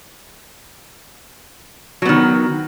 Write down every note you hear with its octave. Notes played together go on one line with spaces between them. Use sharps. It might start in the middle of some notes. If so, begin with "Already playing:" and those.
D#3 F#3 B3